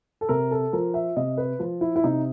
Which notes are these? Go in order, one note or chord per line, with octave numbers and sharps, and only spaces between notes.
A4
C3 A#4
A4
F3 A#4
E5
C3 D#5
B4
F3 F4
E4
E4
C3 D#4